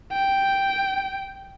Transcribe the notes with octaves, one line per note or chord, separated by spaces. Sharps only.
G5